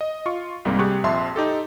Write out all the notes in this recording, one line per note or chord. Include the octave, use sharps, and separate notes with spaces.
D#5
F4 C#6
C2 G#2 G3 A#3 C4
C3 G3 G4 G#4 C#6 F#6
A#1 F2 E5 A5 C6
D#4 G4 A4